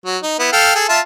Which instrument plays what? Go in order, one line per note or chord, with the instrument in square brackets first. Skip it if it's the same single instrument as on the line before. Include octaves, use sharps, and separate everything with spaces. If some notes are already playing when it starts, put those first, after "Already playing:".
[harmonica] F#3
D#4
B3 E4
A4 F5 G5
G#4 A4
F4 E5 A5